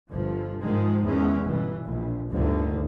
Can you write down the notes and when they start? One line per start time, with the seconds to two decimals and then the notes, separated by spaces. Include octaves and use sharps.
0.11 G1 F3
0.60 G#2 D#3 F3 G#3
1.04 E2 G#3 C#4
1.45 G1 B2 E3
1.84 A#1
2.31 G1 D2 A2 D3 D#3